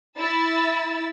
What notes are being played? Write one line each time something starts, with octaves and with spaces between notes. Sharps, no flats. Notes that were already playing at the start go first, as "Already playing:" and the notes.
E4 E6 A6